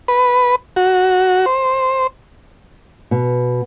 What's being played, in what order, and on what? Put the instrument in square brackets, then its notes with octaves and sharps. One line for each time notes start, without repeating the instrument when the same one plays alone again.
[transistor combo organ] B4
F#4
C5
[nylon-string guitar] B2